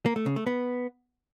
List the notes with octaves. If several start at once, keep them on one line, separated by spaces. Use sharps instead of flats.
A#3
A3
C#3
A3
B3